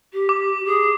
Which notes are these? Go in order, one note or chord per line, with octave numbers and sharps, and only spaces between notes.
G4
D6
G#4